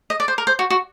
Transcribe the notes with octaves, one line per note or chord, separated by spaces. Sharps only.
D#5
D5
C5
A#4
C5
F#4
F#4